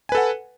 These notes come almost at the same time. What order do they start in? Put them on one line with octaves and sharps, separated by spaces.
G#5 B4 A4 F#5